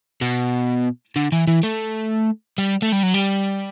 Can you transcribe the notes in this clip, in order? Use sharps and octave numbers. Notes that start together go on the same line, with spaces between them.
B2
D3
E3
E3
A3
G3
A3
G3
F#3
G3